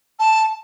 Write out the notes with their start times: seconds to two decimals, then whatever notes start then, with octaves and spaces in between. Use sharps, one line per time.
0.19 A5